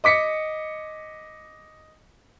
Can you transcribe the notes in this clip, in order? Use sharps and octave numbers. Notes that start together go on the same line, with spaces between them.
D#5 D6 B6 C#7